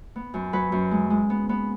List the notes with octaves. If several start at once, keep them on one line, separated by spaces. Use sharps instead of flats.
B3
F#2
F#3 B4
F#2
G#3
G#3
B3
B3